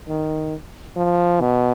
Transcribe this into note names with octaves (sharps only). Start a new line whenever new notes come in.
D#3
F3
B2